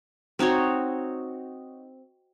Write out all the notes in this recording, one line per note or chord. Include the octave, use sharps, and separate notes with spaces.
C4 D#4 F#4 C#5